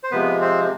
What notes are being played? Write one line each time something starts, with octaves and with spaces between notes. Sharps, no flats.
C5
C3 F3 G#3 B3 B4
C4 C5